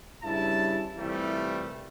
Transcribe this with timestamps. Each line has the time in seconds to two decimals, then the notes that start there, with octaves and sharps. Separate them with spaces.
0.22 G2 C#3 E4 A5
0.97 C2 F2 E3 G3 A3